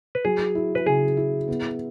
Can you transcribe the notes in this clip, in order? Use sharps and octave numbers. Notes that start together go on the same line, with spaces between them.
B4
F#3 G#4
E4
B4
C#3 G#4
E4
B3